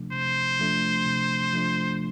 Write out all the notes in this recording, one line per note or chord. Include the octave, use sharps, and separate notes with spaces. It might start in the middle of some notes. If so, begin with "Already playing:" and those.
Already playing: C3 F3 A3 D4
C3 C5
F3 A3 D4
C3
F3 A3 D4